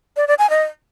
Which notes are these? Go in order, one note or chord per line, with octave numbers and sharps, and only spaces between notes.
D5
D5
G#5
D#5